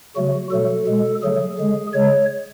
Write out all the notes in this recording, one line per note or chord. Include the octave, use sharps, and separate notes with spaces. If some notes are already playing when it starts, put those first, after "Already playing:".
C#3 F#3 A3 F#4
B2 F#3 A3 A4
B2 G#3
D3 F#3 A3 G#4
D3 G#3
C#3 G#3 C#5